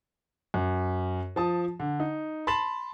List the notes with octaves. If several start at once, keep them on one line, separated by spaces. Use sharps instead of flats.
F#2
F3 A5 D#6
D3
D#4
A5 B5 C6 A6 E7 F#7